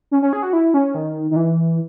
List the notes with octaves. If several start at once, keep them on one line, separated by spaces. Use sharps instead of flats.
C#4
C#4
G#4
F#4
E4
C#4
D#3
D#3
E3